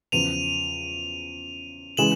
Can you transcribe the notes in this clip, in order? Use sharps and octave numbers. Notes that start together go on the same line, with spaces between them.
E2 C#3 F3 D#7 F7
C#3 E3 G#3 E7 F#7